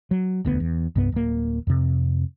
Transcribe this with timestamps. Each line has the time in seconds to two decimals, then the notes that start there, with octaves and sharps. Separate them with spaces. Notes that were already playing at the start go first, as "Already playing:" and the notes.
0.11 F#3
0.45 E1 D2 B3
0.60 E2
0.96 C2 G2 B3
1.12 D1 A#3
1.67 F2 C3